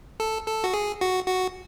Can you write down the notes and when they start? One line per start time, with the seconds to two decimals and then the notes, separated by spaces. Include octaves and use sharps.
0.20 A4
0.47 A4
0.64 F#4
0.74 G#4
1.01 F#4
1.28 F#4